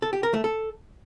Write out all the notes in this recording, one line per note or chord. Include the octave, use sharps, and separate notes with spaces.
A4
G4
A#4
A3
A4